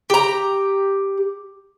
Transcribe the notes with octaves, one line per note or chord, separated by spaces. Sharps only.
G4 A#5